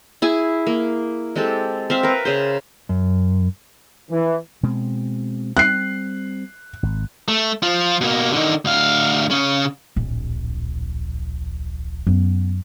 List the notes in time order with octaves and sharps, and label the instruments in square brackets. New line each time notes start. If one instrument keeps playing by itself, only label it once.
[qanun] E4 G#4 G#5
A#3
G#3 C4 G4 A4
C4 E5 F5
A#4 B4
C#3 G#4 C5
[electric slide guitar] F#2
[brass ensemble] E3
[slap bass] B2 G#3 C4
[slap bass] G3 C4 [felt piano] F#6 C7
[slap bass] G#1
[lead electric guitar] A3
F3 F4
B2 A#3
D3 D#3
D2 F5
C#3 C#4
[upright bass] D1 A#1
[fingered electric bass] F#2 [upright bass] B3